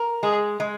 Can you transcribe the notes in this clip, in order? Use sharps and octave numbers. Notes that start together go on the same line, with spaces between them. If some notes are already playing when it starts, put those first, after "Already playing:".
Already playing: A#4
G#3 G#4
G#3